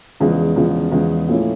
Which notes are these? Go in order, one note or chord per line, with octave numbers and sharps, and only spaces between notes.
E2 C#3 F3 G#3
E2 C#3 F3 G#3
E2 C#3 F3 G#3
A#2 F3 A3 C#4 E4